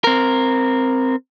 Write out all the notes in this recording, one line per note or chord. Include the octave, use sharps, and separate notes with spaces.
C4 A#4